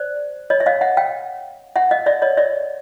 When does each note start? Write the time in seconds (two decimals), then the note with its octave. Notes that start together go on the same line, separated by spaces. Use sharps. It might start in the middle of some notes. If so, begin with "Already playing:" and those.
Already playing: C5 D5
0.50 C#5 D#5
0.60 E5
0.66 D#5 F5
0.81 E5 F#5
0.97 F5 G5
1.76 E5 F#5
1.91 D#5 F5
2.06 D5 E5
2.22 C#5 D#5
2.37 D5 E5